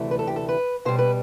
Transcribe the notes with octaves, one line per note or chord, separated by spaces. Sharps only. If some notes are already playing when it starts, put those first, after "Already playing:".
Already playing: D2 C3 E3 A3
B4
A4
G4
A4
B4
B2 G3 C5
B4